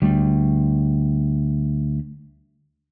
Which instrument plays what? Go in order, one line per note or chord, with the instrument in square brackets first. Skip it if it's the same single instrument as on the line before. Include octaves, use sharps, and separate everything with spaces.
[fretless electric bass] D2 G3